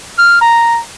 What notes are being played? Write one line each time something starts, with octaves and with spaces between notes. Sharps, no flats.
F6
A#5